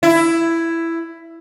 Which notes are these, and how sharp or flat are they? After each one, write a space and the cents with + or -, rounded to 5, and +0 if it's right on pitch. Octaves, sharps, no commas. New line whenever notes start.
E4 +10